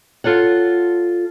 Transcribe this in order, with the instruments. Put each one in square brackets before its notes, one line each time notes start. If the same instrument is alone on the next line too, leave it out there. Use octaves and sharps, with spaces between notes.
[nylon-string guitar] F4 A4 C#5 F#5